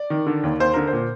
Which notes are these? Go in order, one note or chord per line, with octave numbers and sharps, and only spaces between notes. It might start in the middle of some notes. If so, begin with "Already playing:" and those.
Already playing: D5
D#3
D3
D#2
D#2 C5
D3 A#4
C5
A#2